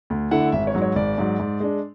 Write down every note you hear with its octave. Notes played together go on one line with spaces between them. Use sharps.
D2
D3 A3 E4 F#5
G#1 E5
C#5
G#2 F#3
C#5
G#1 D5
G#2 F#3
G#2
G#3 D4